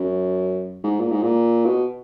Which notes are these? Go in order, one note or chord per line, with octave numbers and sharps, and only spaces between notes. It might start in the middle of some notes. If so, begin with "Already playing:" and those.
Already playing: F#2
G#2
A#2
G#2
A#2
B2